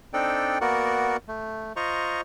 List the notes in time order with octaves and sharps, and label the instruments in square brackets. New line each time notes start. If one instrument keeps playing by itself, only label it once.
[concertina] C4 D4 D#4 A4 D5 G5
A#3 B3 F#4 A#4 D5 F#5
A3
F4 C5 D#5 A#5 C#6